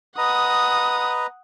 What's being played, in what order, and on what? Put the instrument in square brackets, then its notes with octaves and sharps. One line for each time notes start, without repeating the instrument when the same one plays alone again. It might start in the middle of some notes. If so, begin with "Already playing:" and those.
[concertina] B4 D#5 A#5 [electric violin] F#5 D#6